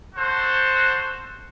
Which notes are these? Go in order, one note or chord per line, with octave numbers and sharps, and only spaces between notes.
F#4 A4 C5